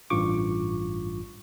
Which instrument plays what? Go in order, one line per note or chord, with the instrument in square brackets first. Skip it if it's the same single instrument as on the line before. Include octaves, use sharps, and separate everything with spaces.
[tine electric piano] A1 G2 F4 C#6 D6